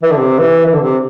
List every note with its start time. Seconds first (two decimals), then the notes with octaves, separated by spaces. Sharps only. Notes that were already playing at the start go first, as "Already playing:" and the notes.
0.03 E3
0.11 D3
0.18 C3
0.39 E3
0.66 E3
0.74 D3
0.81 C3